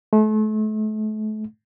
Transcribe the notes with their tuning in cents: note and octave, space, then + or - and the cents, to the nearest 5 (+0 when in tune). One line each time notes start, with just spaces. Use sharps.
A3 -35